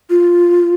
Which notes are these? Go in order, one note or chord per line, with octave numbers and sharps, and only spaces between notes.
F4